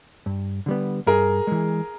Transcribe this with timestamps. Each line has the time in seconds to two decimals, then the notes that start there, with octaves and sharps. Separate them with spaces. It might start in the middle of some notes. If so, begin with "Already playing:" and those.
0.26 G2
0.66 D3 G3 B3
1.07 G2 G#4 A#4
1.47 E3 G#3